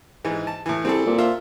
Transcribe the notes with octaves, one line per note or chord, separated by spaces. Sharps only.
G#2 E3 G#3
A5
A2 E3
C2 C4 G#4 A4
A#2
F4 C5 E5